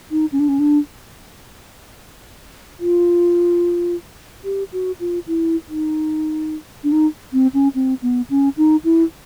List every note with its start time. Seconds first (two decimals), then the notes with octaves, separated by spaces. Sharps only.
0.11 D#4
0.32 C#4
0.40 D4
0.49 C#4
0.59 D4
2.80 F4
4.44 G4
4.73 F#4
5.00 F4
5.27 E4
5.69 D#4
6.84 D4
6.92 D#4
7.33 C4
7.54 C#4
7.75 C4
8.02 B3
8.30 C#4
8.57 D#4
8.84 E4